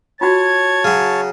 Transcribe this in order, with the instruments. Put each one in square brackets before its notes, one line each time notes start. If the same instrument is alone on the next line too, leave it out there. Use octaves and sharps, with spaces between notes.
[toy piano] F4 F#4 [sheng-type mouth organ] C#5 A5 [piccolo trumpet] G#6
[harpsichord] C#3 F#3